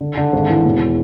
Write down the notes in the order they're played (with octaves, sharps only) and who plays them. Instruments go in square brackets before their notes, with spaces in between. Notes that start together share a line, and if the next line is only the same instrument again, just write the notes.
[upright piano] D3
D3
G#1
E3
E1